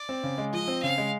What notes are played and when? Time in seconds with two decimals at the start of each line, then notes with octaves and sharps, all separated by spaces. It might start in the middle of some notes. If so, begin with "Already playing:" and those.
Already playing: D5
0.09 C4
0.23 C#3
0.38 G#3
0.53 F3 D#5
0.68 C4
0.82 C#3 F5
0.98 G#3